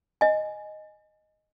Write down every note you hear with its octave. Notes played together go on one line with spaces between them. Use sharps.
D#5 G#5